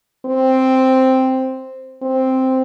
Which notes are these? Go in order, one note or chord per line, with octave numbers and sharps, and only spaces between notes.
C4
C4